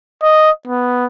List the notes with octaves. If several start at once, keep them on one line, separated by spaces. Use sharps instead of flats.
D#5
B3